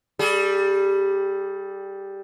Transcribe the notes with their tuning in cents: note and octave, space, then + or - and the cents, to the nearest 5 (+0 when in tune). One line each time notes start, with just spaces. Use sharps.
G3 +0 G#4 +40